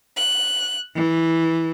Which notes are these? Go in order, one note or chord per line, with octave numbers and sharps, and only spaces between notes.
F#6
E3